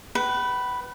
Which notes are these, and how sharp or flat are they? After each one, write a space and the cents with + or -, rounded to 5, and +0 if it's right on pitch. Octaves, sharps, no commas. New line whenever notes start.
B4 +0 F#5 +45